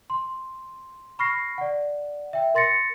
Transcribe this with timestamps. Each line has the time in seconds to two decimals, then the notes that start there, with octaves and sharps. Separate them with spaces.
0.10 C6
1.19 B5 C#6 F6 A#6 C7
1.58 D5 F#5
2.33 E5 G5
2.54 A#4 C6 A6 A#6 C#7